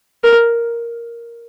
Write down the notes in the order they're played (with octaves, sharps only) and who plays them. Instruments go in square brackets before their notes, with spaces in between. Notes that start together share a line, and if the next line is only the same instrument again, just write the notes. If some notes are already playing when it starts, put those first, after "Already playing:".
[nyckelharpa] A#4